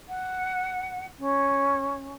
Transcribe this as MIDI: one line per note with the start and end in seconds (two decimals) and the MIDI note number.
0.08 1.06 78
1.18 2.14 61